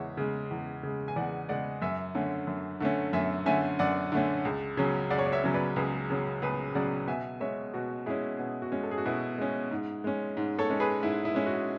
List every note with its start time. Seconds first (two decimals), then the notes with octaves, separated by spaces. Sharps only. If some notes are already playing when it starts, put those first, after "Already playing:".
Already playing: E2 C#3 G#3 C#5 E5 F#5
0.17 C#3 G#3
0.51 E2
0.83 C#3 G#3
1.08 G#5
1.16 E2 D5 F#5
1.49 C#3 G#3 D5 F#5
1.82 F#2 E5 G#5
2.15 D3 A3 C#4
2.47 F#2
2.80 D3 A3 C#4
3.13 F#2 E5 G#5
3.46 D3 A3 C#4 E5 G#5
3.79 F#2 D5 F#5
4.12 D3 A3 C#4
4.45 C#2
4.77 C#3 F#3 C#4
5.10 C#2 D5 F#5
5.18 C#5
5.26 D5
5.32 C#5 E5
5.44 C#3 F#3 C#4
5.54 B4 D5
5.76 C#2 G#4 B4
6.10 C#3 F#3 C#4
6.42 C#2 G#4 B4
6.75 C#3 F#3 C#4 D5 F#5
7.07 B2 E5 G#5
7.40 G#3 C#4 C#5 E5
7.74 B2 F#4
8.06 G#3 C#4 E4 G#4
8.39 B2
8.62 F#4
8.72 G#3 C#4
8.83 A4
8.91 G#4
8.98 F#4
9.05 B2 E4 G#4
9.38 G#3 C#4
9.71 G#2
10.04 G#3 C#4
10.37 G#2
10.59 A4 C#5
10.70 G#3 C#4
10.80 G#4 B4
11.03 G#2 E4
11.25 E4
11.35 G#3 C#4
11.46 F#4